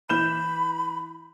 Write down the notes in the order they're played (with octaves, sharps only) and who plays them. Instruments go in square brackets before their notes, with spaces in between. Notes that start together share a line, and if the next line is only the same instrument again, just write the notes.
[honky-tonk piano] E3 G6 E7 [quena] B5